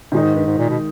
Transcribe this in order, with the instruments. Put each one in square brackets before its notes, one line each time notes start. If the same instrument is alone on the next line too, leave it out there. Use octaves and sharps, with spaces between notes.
[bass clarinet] A#2 [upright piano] D#3 G#3 D#4
[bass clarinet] G#2
G2
G#2
A#2
B2